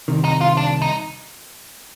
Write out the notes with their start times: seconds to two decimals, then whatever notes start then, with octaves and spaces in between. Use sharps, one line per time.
0.08 C2 C3 D#3
0.25 D#4
0.41 F4
0.57 D4
0.82 D#4